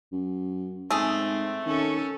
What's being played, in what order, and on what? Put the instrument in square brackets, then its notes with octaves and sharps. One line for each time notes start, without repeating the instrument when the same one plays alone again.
[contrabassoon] F#2
[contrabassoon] G#2 [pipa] A3 G#4 [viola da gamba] C4
[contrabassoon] D#3 [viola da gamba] C#4 A4